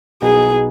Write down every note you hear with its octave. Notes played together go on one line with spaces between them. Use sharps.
B1 B2 B3 D#4 G#4